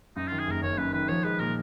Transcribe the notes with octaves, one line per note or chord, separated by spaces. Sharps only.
F#2 D#4
D#3 F4
G#4
F#1 A#4
F#1 C#5
F#2 B4
D#3 B4
F3 C#5
G#3 B4
A#2 A#4